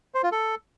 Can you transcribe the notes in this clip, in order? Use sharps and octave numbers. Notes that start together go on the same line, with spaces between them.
C5
F4
A4